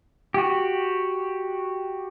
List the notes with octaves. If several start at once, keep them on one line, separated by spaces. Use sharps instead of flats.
F#4 G4